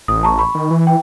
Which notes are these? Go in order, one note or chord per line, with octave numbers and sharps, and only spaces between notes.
A1 D#6
A5 A#5 C#6
B5 C#6
D#3
E3
G5